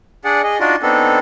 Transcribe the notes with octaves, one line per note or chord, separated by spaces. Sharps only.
D4 G#4 D5 F#5
G#4 D#5
D4 D#4 F4 F#4 D5
B3 C4 D4 D#4 A4